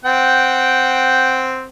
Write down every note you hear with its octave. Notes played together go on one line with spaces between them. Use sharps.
C4 F#5 G5